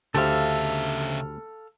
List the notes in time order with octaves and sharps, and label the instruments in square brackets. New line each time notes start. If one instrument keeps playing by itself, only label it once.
[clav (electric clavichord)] D2 G4 C5 [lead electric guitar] C#3 E5 [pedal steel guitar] A4 F5